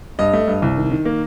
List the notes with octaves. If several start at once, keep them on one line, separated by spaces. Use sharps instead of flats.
G2 D#5
A3
G2
C2
D#3
D#3
A#3